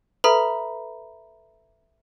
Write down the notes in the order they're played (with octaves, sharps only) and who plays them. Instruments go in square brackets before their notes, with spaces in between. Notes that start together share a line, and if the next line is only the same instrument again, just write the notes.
[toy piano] A4 B4 [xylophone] E5 A#5 B5